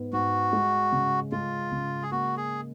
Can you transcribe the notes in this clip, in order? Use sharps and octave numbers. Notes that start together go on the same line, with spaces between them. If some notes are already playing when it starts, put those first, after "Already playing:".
Already playing: G#2 B3
G#2 F#4
G#3
C#3
G#3 F4
C#3
G#4
A#3 F#4
G#4